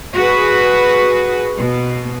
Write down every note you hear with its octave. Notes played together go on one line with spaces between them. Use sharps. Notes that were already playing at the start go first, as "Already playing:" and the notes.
F#4 G#4 B4
B2